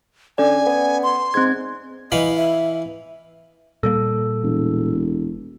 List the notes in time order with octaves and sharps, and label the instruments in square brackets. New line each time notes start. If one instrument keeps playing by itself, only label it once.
[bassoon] D3 [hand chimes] C#4 D5 [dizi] G#5
[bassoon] B3
[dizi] C6
[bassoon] G#2 [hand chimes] C4 G#6
[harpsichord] E3 F5 B5 [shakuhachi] D#5
[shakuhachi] E5
[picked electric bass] A#2 G3 A#3 [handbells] A4
[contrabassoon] E1